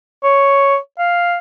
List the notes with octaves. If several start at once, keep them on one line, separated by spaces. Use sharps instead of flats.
C#5
F5